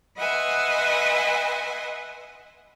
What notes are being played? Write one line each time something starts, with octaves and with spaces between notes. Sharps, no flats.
B4 D#5 E5 F#5 G#5 C6